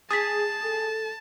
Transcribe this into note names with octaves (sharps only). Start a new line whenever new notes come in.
G#4 A5 D#6 A6 B6
A4